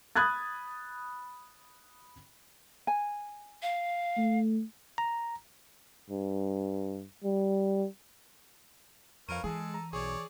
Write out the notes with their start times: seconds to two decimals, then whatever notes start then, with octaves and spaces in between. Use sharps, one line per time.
0.16 B5 D#6 F#6 G#6 A6
2.87 G#5
3.62 F5
4.17 A3
4.98 A#5
6.10 G2
7.24 G3
9.29 F2 A#4 B4 C#5 F5 D7 D#7
9.44 E3 G#3 G#4 A4
9.74 A#5
9.93 B1 G#4 C#5 D5